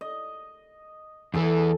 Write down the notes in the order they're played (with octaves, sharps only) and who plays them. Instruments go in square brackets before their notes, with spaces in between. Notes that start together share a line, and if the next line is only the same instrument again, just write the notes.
[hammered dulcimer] D#5
[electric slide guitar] E2 E3 [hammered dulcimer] G#4 A4